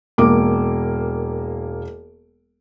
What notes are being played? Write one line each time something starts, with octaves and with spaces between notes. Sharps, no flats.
E1 A#3 D6